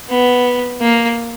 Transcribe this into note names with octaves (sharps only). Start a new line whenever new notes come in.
B3
A#3